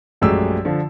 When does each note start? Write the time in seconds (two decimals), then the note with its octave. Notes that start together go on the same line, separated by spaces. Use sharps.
0.21 A#1 F#2 G#3 A3 G4 E6
0.65 D3 F3